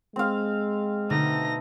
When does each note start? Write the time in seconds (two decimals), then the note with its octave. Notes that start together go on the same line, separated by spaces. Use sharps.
0.16 G#3 C4 F5
1.10 B2 D3 A3 D#4 A#6